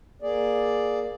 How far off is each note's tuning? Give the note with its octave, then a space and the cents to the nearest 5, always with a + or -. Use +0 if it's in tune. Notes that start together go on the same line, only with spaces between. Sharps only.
A#3 +10 G#4 +0 D5 +0